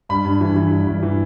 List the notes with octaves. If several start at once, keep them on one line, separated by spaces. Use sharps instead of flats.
G2 B5
G2
E3
E3
G2
G2
E3